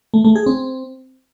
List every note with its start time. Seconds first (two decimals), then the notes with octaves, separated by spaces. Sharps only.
0.14 A3
0.25 A3
0.35 G#4
0.46 C4